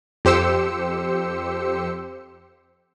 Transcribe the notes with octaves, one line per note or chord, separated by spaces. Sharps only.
F2 G4 C5 E6 C#7